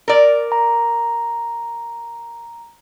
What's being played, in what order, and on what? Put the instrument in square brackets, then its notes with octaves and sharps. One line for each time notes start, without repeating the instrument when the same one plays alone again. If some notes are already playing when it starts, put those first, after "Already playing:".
[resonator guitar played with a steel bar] A#4 D5
[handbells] A#5